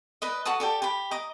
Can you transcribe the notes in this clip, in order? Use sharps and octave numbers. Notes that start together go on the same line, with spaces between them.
B4 D5 D#5
F#4 A4 A5 D#6
G4 A4 D5
G4 B5
D#5 A#5 D6